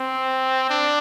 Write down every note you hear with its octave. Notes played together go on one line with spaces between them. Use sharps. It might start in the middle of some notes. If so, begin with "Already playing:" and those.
Already playing: C4
D4